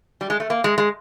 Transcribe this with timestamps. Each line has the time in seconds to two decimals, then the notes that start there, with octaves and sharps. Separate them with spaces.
0.21 G3
0.30 G#3
0.40 A3
0.50 A#3
0.64 G#3
0.78 G#3